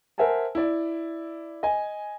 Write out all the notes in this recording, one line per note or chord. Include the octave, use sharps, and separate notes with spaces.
A#4 C5 E5 F#5 G#5 A5
E4 D5
D#5 G#5